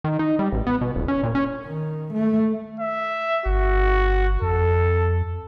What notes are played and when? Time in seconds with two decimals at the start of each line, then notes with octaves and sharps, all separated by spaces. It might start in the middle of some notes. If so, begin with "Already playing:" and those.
0.04 D#3
0.19 D#4
0.39 G3
0.52 A1
0.67 B3
0.81 B2
0.96 D#1
1.08 C#4
1.23 A#2
1.35 C#4
1.65 D#3
2.14 A3
2.80 E5
3.46 G1 F#4
4.42 F2 A4